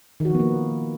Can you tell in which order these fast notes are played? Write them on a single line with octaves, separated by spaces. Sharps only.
D#3 F#4 F3 B3 A#3